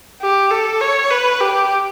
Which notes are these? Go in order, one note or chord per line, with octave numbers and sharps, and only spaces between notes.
G4
A4
C#5
B4
G4